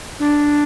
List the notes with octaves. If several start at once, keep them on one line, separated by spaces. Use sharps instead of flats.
D4